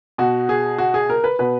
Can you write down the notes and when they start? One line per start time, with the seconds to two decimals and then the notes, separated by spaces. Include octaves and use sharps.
0.18 B2 F#4
0.49 G#4
0.78 F#4
0.94 G#4
1.10 A#4
1.24 B4
1.39 B2 B4